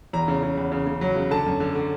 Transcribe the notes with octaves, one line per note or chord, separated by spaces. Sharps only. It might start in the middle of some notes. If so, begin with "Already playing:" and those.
E2 A#5
C#3
C#3
E2
C#3
C#3
F#3
C#3
D3 A5
F#2
D3
D3